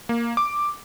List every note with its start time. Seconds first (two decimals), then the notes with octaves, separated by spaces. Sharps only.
0.09 A#3
0.37 D6